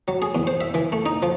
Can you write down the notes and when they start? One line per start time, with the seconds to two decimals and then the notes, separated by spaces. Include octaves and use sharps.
0.08 F#3
0.22 G#4
0.35 E2
0.47 C5
0.61 E5
0.74 E3
0.92 A3
1.06 D#4
1.22 F3